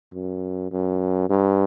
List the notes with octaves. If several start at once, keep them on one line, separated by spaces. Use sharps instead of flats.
F#2
F#2
G2